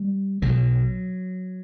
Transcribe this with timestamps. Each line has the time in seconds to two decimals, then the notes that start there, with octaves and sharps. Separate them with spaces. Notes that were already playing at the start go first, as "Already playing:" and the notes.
Already playing: G3
0.42 B1 B2 F#3